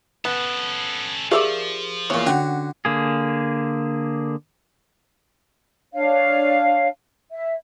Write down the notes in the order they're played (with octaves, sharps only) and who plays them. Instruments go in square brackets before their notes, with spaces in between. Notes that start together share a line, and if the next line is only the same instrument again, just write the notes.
[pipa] B3 [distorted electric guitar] C#4 A4
[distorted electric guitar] F3 [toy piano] G4 G#4 A#4 [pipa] D5 E5 F5
[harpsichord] E2 A#2 [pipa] C#5
[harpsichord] D3 F#4 [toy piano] C#4
[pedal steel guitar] D3 A#3 G#4
[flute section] D4 C#5 F5
E5